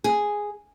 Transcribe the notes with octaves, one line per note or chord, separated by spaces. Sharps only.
G#4